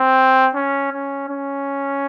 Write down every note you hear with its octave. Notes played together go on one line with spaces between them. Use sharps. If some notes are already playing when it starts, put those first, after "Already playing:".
Already playing: C4
C#4
C#4
C#4